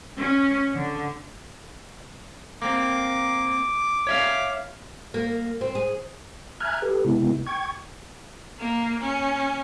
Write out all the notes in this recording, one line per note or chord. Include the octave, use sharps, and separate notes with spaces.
C#4
D3
A#3 C4 D6
C#5 E5 F5
A#3
C4
G#4
E5 G#5 A#5 F6 F#6 G#6
G4 A4 B4
C3 G#3 B3 E4
G5 C#6 G#6
A#3
C#4